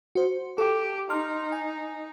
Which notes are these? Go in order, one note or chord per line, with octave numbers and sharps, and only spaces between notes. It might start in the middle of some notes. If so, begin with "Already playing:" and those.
F#4 C5
G4 A4
D#4 C6 F6
G#5